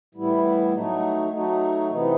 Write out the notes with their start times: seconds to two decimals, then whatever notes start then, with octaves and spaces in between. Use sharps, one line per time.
0.15 A2 E3 G3 B3 E4
0.73 F#3 A3 D#4
1.31 F#3 A3 D#4
1.90 C3 E3 B3 D#4